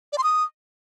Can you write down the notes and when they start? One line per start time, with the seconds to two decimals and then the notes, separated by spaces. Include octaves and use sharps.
0.13 D5
0.18 C6
0.24 D#6